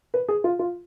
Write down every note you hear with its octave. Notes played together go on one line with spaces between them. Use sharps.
B4
G#4
F4
F4